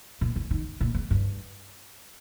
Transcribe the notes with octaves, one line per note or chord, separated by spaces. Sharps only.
A#2
D3
D#3
A#2
G#2
G2